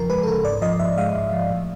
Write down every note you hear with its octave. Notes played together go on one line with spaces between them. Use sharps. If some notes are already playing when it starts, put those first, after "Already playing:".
Already playing: F2 C#3 F3 A#4
G#3 B4
A4
C#3 A#4
G#2 D5
F3 D#5
G#2 E5
G#3 F5
G#2
F3
A2